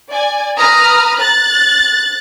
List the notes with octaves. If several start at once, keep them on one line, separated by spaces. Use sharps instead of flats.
D5 G#5
B4 A#5 D#6 F6
F#6 A6